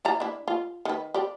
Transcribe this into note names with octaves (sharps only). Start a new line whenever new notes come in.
E4 D5 A#5
D4 E4
F4
D#3 B4
G4 D5